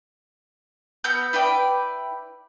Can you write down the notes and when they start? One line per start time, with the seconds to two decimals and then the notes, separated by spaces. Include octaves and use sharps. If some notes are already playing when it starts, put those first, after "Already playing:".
1.04 B3 F#4 E6 G6
1.33 E4 B4 D5 G5